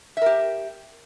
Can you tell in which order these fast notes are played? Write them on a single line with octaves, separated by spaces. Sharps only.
E5 A#4 G4